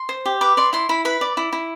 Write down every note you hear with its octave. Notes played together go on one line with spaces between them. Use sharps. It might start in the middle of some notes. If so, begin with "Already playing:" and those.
Already playing: C6
C5
G4
B4 D6
D5 C6
E4 C6
E4 B5
B4 B5
D5
E4
E4